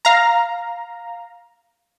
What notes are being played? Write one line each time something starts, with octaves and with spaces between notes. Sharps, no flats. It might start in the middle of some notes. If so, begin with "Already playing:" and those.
F5 A#5